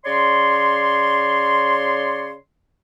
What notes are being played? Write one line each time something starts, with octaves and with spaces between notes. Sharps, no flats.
C#3 C#5 D5 C6